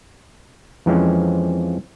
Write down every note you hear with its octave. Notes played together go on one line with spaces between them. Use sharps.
F2 E3 F3 G#3 C4 C#4